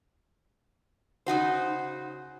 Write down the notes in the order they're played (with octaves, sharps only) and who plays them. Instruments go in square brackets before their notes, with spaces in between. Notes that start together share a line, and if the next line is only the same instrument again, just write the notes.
[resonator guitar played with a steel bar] C#3 D#4 F#4 C5